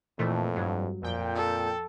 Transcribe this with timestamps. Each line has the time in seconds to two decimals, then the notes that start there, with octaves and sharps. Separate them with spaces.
0.19 F2 A#2 E3 A3
0.55 G2 F#3
1.03 F2 A#2 G5
1.35 A4